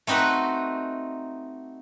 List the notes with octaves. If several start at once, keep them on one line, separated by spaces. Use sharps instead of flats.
A3 C4 D#4 F#4 B4